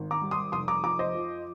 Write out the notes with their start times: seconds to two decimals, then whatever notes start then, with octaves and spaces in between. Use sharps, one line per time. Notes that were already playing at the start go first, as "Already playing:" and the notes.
Already playing: G#1
0.11 A#5 D6
0.21 G3
0.31 C6 D#6
0.52 F1 C6 D#6
0.68 A#5 D6
0.84 F2 A#5 D6
0.99 C5 D#5
1.15 F3